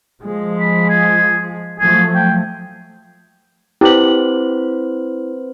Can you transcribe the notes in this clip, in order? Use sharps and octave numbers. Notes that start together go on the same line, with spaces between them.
F3 G#3
B5
G#4
F3 F#3 A3 G#4
G5
C4 E4 G4 B4 C5 F#7